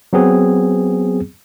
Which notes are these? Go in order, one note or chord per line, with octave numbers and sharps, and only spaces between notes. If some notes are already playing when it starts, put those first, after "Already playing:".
F#3 B3 C4 G#4